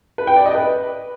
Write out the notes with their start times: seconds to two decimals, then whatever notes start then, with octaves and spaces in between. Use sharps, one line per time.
0.18 B4
0.27 G5
0.36 D5
0.46 D#5
0.55 B4